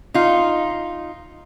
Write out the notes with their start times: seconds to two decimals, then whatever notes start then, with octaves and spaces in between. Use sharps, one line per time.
0.14 D#4 F4